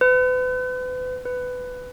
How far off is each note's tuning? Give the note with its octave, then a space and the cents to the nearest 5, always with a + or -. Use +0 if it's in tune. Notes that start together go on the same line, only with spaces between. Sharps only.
B4 +40
B4 +15